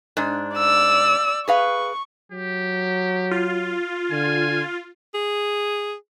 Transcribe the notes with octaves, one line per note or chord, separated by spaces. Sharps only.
G#2 D4
D5 E6
G#4 B4 F5 C#6
F#3 G4
F4
D3 G#5
G#4